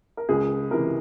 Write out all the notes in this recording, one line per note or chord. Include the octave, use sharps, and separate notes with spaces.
A#4
C#2 G#4
C3 E3 A#4